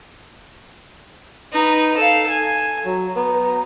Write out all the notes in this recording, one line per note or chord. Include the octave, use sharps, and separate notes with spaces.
D#4 B4
A4 F5
G#5
F#3 A#5
B3 A#5